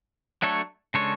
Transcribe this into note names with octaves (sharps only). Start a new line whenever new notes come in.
F#3 A3 D4 A4 C#5
C#3 G#3 D4 A4 C#5